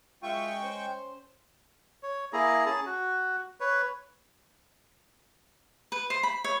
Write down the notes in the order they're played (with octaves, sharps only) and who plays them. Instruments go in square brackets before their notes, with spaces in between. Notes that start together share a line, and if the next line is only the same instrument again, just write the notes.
[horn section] F#2 F4 E5 [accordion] G#3 G5 C#6
[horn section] C#4 C5
[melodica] C#5
A#3 E4 G#4 A#5
C#4 G#4 A5
F#4
B4 C#5
[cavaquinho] B4
C5
B5
C#5